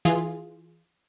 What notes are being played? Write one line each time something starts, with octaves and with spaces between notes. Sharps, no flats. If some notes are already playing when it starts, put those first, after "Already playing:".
E3 F4 G#4